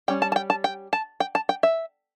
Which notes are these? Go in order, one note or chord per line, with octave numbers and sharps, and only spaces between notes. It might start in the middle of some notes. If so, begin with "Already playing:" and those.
G3 C#4 G5
A5
A5
G5
A5
G5
A5
G5
A5
G5
E5